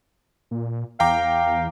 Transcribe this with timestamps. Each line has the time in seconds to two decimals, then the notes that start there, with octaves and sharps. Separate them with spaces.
0.51 A#2
1.00 E2 F5 G5 A#5 D6